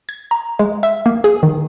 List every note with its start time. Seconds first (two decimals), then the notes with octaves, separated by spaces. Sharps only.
0.09 G#6
0.31 A#5
0.59 G#3
0.83 E5
1.06 A#3
1.24 G#4
1.43 D#3